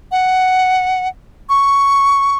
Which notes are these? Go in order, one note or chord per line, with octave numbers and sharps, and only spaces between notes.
F#5
C#6